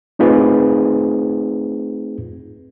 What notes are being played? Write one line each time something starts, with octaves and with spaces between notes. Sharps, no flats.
A3 C4 D#4 F4 G#4 B4